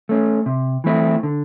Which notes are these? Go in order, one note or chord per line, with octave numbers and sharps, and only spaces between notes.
A3 C#4
C3
E3 A3 C4 E4
D3